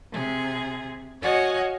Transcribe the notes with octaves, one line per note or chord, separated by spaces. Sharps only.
C3 G#4
F#4 C#5 D#5 F5 F#5 G#5